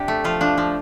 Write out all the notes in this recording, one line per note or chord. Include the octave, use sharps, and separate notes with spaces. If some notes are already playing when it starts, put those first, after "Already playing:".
Already playing: C3 D4 G4
A3
F3 F4
F3 D4
F3